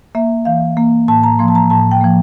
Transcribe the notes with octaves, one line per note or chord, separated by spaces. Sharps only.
A#3 E5
E3 F5
A#3
A2 A5
A#5
F3 A#3 C6
A5
A#5
A2 A5
G5
F3 A#3